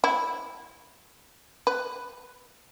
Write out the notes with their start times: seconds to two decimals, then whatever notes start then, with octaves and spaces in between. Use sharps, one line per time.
0.04 E4
1.67 B4